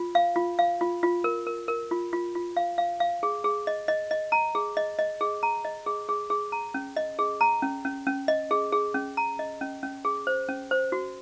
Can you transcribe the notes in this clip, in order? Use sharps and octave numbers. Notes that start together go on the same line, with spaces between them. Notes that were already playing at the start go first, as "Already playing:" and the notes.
Already playing: F4
F5
F4
F5
F4
F4
A#4
A#4
A#4
F4
F4
F4
F5
F5
F5
G#4
G#4
D#5
D#5
D#5
A#5
G#4
D#5
D#5
G#4
A#5
D#5
G#4
G#4
G#4
A#5
C#4
D#5
G#4
A#5
C#4
C#4
C#4
D#5
G#4
G#4
C#4
A#5
D#5
C#4
C#4
G#4
C5
C#4
C5
F#4